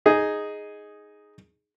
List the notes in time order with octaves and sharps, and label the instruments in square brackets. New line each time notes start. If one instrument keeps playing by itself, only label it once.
[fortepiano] D#4 G#4